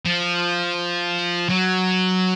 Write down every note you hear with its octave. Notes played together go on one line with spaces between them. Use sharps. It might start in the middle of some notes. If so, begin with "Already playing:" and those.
F3
F#3